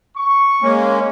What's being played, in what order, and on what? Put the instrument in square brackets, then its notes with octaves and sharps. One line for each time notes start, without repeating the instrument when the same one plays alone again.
[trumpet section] C#6
[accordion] G#3 A#3 C#4